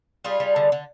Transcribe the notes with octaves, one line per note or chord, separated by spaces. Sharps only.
G3 F4 G#4
G3
D3
D3